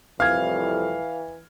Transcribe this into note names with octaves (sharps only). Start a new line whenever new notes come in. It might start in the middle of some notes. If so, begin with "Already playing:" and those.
C2 F2 A2 E3 F5 F6 G#6